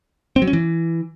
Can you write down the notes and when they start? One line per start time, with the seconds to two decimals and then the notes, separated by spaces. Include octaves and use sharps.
0.36 C4
0.42 F#3
0.47 C#4
0.53 E3